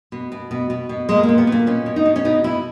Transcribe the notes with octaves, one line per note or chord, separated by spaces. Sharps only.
B2
B2
B2
B2
B2
A#2 G#3
A#3
A#2
B3
A#2
A#3
B2 C#4
B2
D#4
B2
C#4
B2 D#4
B2 E4